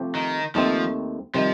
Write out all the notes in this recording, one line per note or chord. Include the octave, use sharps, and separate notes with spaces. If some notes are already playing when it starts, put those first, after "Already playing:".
Already playing: C3 F3 A3 C4 G4
D#3
D#2 D#3 F3 A3 C4
C3 D#3 F3 G3